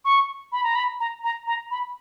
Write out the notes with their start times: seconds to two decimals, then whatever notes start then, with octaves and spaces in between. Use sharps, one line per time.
0.05 C#6
0.52 B5
0.63 A#5
0.75 B5
1.00 A#5
1.24 A#5
1.47 A#5
1.71 B5